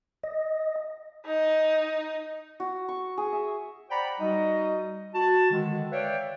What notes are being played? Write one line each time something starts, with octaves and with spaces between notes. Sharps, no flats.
D#5
D#4
F#4
C#6
G#4
E5
C5 D5 F#5 G5 A#5 B5
G3 D#4 F#4 D#5
F#4 A5
D3 D#3 G#3
B4 C#5 D5 E5 F5 G5